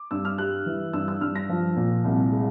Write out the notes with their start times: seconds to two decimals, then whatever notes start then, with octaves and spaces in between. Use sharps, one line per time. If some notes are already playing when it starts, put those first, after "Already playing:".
Already playing: D6
0.11 G2 E6
0.25 F6
0.38 G3 F#6
0.66 E3
0.93 G2 E6
1.08 E6
1.21 G2 F6
1.36 A#6
1.49 F3
1.76 A#2
2.04 C2
2.32 G#3